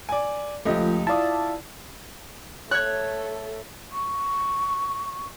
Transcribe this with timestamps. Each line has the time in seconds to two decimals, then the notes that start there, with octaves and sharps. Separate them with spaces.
0.09 D5 G#5
0.65 C#2 F3 A3 G4 D#5
1.07 E4 F4 D5 A5 D#6
2.71 A3 A4 C#5 F#6 G#6
3.92 C#6